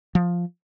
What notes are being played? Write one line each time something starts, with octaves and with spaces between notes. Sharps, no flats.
F3